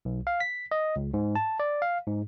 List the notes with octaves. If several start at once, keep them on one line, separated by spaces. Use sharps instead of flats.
B1
F5
B6
D#5
C#2
G#2
A5
D5
F5
G#2